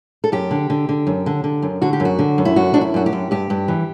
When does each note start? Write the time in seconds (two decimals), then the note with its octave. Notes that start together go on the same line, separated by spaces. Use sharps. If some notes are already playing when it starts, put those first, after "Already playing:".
0.24 A4
0.32 F#2 G4
0.51 D3
0.70 D3
0.89 D3
1.07 F#2
1.26 D3
1.44 D3
1.62 F#2
1.82 D3 F#4
1.93 G4
2.00 F#2
2.05 F#4
2.19 D3
2.38 F#2
2.45 E4
2.56 F#2 F#4
2.74 F#2 D4
2.81 E4
2.94 F#2 F#4
3.06 G4
3.13 F#2
3.31 G2 G4
3.50 G2
3.68 E3